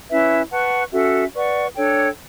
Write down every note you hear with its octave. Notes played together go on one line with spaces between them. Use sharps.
C#4 E4 B4 E5
B4 F#5 A5 C#6
C#4 F#4 A4 E5
B4 D5 F#5 C#6
D4 A4 C#5 G5